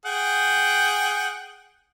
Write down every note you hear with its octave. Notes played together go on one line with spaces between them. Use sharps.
G#4 F#5 G5